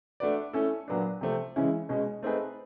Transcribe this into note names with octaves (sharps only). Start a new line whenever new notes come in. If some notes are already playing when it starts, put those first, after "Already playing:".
A3 D4 F#4 B4 D5
A3 C#4 E4 A4
A#2 F#3 B3 D4
C3 F3 A3 C4
C#3 E3 G#3 C#4 E4
B2 G#3 C#4
A3 C4 D#4 G#4 B4